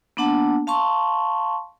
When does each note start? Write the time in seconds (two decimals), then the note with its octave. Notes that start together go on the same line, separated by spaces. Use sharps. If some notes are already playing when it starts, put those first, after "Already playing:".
0.17 A#3 B3 D4 F#5 A5
0.67 F5 A5 C6 C#6